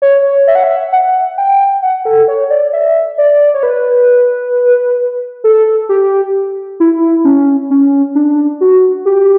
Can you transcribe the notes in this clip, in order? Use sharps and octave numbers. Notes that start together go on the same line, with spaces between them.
C#5
E5
F#5
E5
F#5
G5
F#5
A4
C#5
D5
E5
D5
C#5
B4
A4
G4
E4
C#4
C#4
D4
F#4
G4